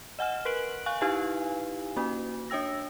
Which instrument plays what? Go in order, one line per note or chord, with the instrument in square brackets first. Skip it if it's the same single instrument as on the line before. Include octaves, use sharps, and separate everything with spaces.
[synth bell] D#5 F#5 G#5 F6 E7
A#4 B4 F#6 D7 F#7
F5 G#5 C#6 F#6
D#4 E4 G4 B4 F5 G#5
A#3 C#4 F#4
D4 C#5 G5 E6 A#6